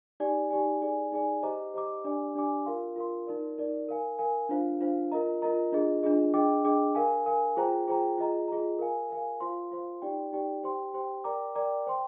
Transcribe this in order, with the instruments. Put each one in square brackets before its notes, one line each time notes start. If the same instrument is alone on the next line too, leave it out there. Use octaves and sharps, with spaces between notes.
[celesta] D#4 G4 D5 G#5
D#4 G4 D5 G#5
D#4 G#4 D5 G#5
D#4 G#4 D5 G#5
G4 C5 D#5 A#5 D6
G4 C5 D#5 A#5 D6
D4 G4 D5 G#5 D6
D4 G4 D5 G#5 D6
F4 A#4 F5 C6
F4 A#4 F5 C6
D#4 A#4 D5
D#4 A#4 D5
A#4 F5 G#5
A#4 F5 G#5
D4 F4 C5 F5
D4 F4 C5 F5
F4 A#4 D#5 A#5
F4 A#4 D#5 A#5
D4 F4 G#4 D#5
D4 F4 G#4 D#5
D4 G#4 D#5 G5 D6
D4 G#4 D#5 G5 D6
A#4 F5 G#5
A#4 F5 G#5
F4 G#4 C5 G5 A#5
F4 G#4 C5 G5 A#5
F4 G#4 D#5 A#5
F4 G#4 D#5 A#5
A#4 F5 G#5
A#4 F5 G#5
F4 C5 F5 C6
F4 C5 F5 C6
D#4 G4 D5 G5
D#4 G4 D5 G5
G4 C5 G5 C6
G4 C5 G5 C6
A#4 D5 G5 A#5 D6
A#4 D5 G5 A#5 D6
C5 G5 C6